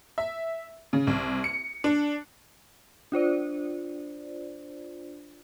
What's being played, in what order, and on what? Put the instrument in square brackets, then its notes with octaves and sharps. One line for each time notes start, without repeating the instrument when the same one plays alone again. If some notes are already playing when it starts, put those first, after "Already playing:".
[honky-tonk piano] E5
C#3
C2
C#7
D4
[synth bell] D4 F4 C5 D5